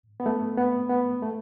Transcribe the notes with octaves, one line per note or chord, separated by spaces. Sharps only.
B3
A3
B3
B3
A3